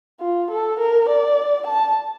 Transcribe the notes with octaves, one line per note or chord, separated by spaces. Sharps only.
F4
A4
A#4
D5
A5